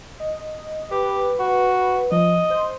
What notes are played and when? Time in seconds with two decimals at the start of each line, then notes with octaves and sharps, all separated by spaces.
0.20 D#5
0.91 G4 B4
1.39 F#4
2.12 F3 D#5
2.50 C5